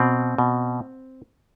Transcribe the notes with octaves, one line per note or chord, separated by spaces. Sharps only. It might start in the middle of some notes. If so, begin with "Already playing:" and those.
Already playing: B2 C4
B2